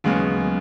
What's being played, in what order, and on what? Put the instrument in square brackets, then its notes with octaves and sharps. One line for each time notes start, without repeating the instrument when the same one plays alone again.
[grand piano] D#2 C#3 G#3 B3 [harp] F#3
[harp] D#3